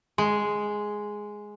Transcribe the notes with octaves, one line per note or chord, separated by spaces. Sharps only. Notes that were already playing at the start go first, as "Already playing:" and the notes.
G#3